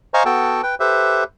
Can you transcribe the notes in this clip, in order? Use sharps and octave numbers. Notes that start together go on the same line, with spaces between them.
C5 D#5 F5 G#5 A#5 C#6
B3 F#4 A4 G5 A5
B4 G5
G4 A4 B4 C5 E5